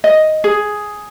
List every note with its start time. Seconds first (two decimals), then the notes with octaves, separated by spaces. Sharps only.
0.04 D#5
0.44 G#4